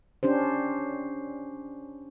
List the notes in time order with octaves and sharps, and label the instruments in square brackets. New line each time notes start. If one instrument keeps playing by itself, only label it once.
[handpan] C#4 D4 G4 C5